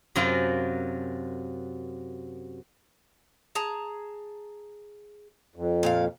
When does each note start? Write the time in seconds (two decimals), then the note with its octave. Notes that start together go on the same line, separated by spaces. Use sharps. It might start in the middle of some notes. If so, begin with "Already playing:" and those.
0.15 F#2 C3 F#3 F4 A#4 A#5
3.55 G#4 A5 A#5
5.56 F2
5.83 A#2 G4 F5